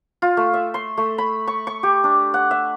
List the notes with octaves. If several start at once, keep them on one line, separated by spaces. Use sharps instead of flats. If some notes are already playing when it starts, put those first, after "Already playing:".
F4
A3
E5
C6
A3
B5
C#6
C#6
G4
D4
F#5
E5